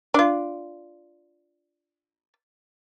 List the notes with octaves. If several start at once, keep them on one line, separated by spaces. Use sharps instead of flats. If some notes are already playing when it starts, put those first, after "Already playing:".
D4 F4